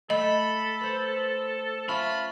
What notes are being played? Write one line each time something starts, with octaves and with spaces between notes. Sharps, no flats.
A3 A4 D#5 B5
B4 C5
C#4 F4 E5 A5 B5